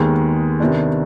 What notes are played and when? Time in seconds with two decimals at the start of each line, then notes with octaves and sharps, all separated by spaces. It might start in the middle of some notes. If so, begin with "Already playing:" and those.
Already playing: D#2 D#3 G#3 B3
0.60 C3 D#3 B3 D4